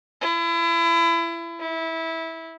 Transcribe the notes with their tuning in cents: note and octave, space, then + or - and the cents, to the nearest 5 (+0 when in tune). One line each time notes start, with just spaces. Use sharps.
E4 +30
E4 -15